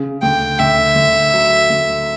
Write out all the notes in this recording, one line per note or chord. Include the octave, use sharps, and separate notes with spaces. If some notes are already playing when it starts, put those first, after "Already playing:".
Already playing: C#3
D2 G5
D2 E5
D2
F#3
D2